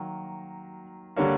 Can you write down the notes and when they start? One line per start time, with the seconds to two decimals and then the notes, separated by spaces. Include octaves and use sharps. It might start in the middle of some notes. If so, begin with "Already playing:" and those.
Already playing: D#3 F#3 A#3
1.16 D3 G3 A#3 C#5